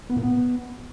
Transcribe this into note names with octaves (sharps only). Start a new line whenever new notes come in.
B3
A#2
B3